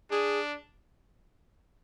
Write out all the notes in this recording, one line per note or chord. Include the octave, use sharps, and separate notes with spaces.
D4 G#4